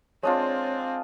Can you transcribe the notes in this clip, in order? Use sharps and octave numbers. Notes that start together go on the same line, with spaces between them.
G#3 C4 D4 F4 C#5